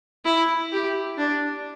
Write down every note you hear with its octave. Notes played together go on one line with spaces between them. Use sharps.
E4
G4
D4